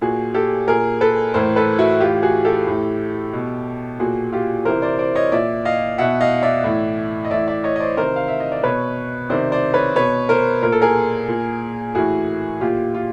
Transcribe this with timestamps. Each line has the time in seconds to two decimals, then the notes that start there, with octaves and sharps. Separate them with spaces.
0.01 A#2 F#4 G#4
0.34 G4 A4
0.68 A#2 G#4 A#4
1.01 A4 B4
1.34 A2 E3 A#4 C5
1.56 A4 B4
1.79 E4 F#4
2.00 A2 E3 F4 G4
2.22 F#4 G#4
2.45 G4 A4
2.67 A2 E3
3.33 B2
3.99 A#2 F#4 G#4
4.32 F4 G4
4.65 C3 E3 A#4 C5
4.82 C5 D5
4.99 C5 D5
5.15 C#5 D#5
5.32 A#2 D5 E5
5.65 D#5 F5
5.98 B2 E5 F#5
6.21 D#5 F5
6.43 D5 E5
6.64 A2 E3
7.25 D#5
7.31 A2 E3 D5 E5
7.47 D5 E5
7.64 C#5 D#5
7.76 D#5
7.80 C5 D5
7.97 C3 D#3 A#4 C5
8.16 F5
8.28 E5
8.40 D#5
8.52 D5
8.64 B2 B4 C#5
9.30 C3 D#3 C5 D5
9.52 C5 D5
9.74 B4 C#5
9.96 B2 B4 C#5
10.29 A#4 C5
10.62 A#2 A#4
10.72 A4
10.81 G#4 A#4
11.28 A#2
11.95 A2 E3 F#4 G#4
12.61 A#2 F4 G4
12.94 F4